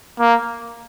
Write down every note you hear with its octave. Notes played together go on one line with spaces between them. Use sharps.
A#3